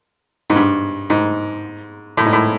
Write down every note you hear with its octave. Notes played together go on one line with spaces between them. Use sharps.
G#2
G2
G#2
A2
G#2
A2